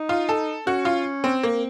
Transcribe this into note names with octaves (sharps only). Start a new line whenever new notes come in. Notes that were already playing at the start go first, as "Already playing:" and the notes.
Already playing: D#4
F4
A4
C#4 F#4
F4
C4
A#3 C4